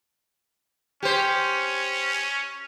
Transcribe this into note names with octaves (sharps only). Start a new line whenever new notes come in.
C#4 G4 C5